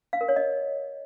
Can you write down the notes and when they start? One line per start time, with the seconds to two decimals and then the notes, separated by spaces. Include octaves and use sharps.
0.13 F5
0.21 A#4
0.29 C#5
0.36 D#5